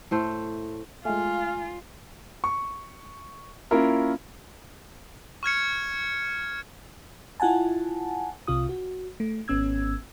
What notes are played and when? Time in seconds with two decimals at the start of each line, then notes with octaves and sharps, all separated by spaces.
0.11 A2 A3 C5
1.05 G#3 A3 F4 F5 G#5
2.44 C#6
3.71 A#3 C#4 E4 F4 A#4
5.43 C#6 F6 G#6 C#7
7.40 E4 F4 F#5 G#5 A5
8.47 C2 C3 F4 D#6
8.69 F#4
9.20 A3
9.48 G#1 B3 C#4 E6 G#6